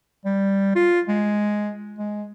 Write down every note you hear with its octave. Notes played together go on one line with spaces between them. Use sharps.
G3
F4
G#3
G#3